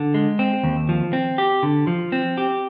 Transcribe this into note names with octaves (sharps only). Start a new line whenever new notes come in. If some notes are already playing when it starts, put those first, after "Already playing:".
Already playing: D3
G#3
C4
D#2
F3
C4
G4
D3
F3
C4
G4